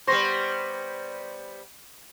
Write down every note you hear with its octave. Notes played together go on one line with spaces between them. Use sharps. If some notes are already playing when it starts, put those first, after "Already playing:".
G3 B3 C5 C6 C#6 A#6